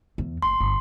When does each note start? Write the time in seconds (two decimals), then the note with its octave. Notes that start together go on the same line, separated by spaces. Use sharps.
0.18 E2
0.42 F#1 C6
0.60 G1